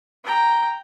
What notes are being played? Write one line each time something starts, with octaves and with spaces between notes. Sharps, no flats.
G5 A#5